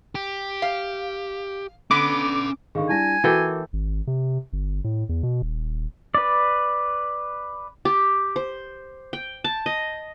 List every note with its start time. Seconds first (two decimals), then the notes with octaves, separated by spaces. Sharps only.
0.15 G4
0.62 F5
1.91 D3 B3 C#4 B5 D6
2.75 D3 D#3 G#4 F5 C#6
2.89 G3 D4 E4 G#5 A5 A#6
3.24 E3 A#3 F#4 A4 A#4 G5 D6
3.73 G#1
4.07 C3
4.53 G1
4.84 A2
5.09 E2
5.23 B2
5.42 D#1
6.14 B4 D5
7.85 G4
8.36 C5
9.13 G5
9.44 A5
9.66 D#5